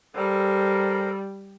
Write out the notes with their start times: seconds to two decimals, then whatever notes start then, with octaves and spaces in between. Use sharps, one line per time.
0.15 G3 A4 A#4 C5